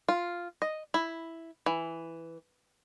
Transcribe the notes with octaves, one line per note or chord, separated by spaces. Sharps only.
F4
D#5
E4
E3